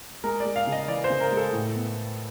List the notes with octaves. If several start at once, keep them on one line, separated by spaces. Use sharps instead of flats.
G#3 A#4
D5
G#3
F5
C#3
D#5
E3 D5
C5
C#3
A#4
G#3
A4
A2
B3